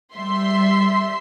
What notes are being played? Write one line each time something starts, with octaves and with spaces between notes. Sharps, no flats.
G3 E5 C6